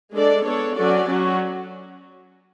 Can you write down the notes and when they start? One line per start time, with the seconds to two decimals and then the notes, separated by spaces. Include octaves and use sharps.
0.14 G#3 D4 A4 D5
0.46 B3 D4 A4 C#5
0.77 F#3 C#4 F#4 A4 D5
1.07 F#3 C#4 F#4